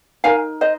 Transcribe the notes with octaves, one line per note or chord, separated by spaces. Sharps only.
D#4 A#4 F5 G#5
C5 D#5